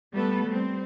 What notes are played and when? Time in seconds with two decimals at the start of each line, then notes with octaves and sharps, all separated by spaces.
0.14 G3 A3 B3 A4 B4
0.47 G3 C4